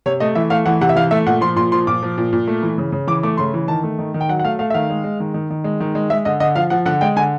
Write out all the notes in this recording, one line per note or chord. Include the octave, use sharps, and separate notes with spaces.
C3 C#5
A3 D#5
E3 E5
A3 F5
E3 F#5
C3 F#5
E5
E3 F5
A3 E5
A#2 F#5
F3 C6
A#2 C6
F3 C6
A#2 D6
F3
A#2
A#2
A3
E3
C#3
C#3
E3 D6
A3 D6
C#3 C6
E3
D#3 A5
A3
D#3
D#3
G5
F#3 F#5
F#5
A3 F5
A3 F5
E5
D#3 F5
G#3
G#3
D#3
D#3
D#3
G#3
D#3
G#3
G#3 E5
D3 D#5
D3 D#5
F3 F5
F3 F#5
D3 F#5
G#3 G5
D3 G#5